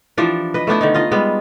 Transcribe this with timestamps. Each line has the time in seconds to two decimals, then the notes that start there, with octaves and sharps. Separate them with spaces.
0.17 E3 F3 D4 G4
0.54 B4 D#5
0.67 A3 B3 D4 E4
0.81 D3 D#3 D#4
0.94 F4 D#5
1.12 G3 G#3 B3